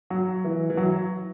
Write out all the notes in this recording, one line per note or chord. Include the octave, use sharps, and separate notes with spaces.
F#3
E3
E3
F#3